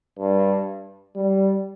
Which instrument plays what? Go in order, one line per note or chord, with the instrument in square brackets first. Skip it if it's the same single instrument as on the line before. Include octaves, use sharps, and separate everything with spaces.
[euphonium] G2
G3